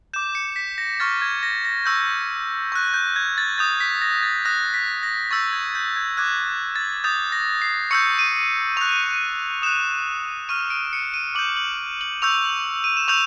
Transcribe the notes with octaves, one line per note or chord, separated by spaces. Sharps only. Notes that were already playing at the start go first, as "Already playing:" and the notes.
D6 G6 E7
C#7
B6
A#6
C#6 F6 A6
G#6
A#6
A#6
C#6 E6 G6
C#6 F#6
G6
G#6
A6
D#6 G6 A6
B6
A#6
A6
D#6 F#6 A#6
B6
A#6
C#6 E6 G6 A6
G#6
G6
G#6
D6 F#6 G#6
A6
D#6 G6 A6
A#6
C7
C#6 E6 G6 C#7
D#7
C#6 F#6 F7
D#6 F#6 E7
C#6 F6 D#7
D7
C#7
D#7
D6 G6 F#7
F#7
F#7
C#6 E6 G6 F7
D#7
E7
C#6 E6 G6 F7